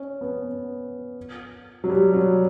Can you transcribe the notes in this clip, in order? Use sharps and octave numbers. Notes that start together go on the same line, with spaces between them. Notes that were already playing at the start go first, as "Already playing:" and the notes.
Already playing: C#4
B3
F#3
G3
F#3